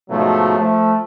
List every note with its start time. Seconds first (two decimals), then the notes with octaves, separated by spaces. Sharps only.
0.10 G#2 B2 F3 F#3 A3
0.58 F3 A3